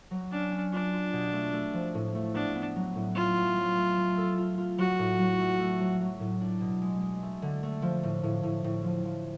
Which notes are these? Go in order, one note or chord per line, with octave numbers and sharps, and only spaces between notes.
F#3
C#4 D4
C#4
D4 F4
F4
B2
A3
A3
F3
A2
A3
B3 D4
B3
F#3
A2
A3 F4
F#3
F#3
A3
A3
A4
F4
F4
F#3 F#4
A2
F#3
A3
A3
F#3
F#3
A2
D4
B2
G#3
G#3
A3
D3
A3
F3
A2
A2
A2
A2
F3
F3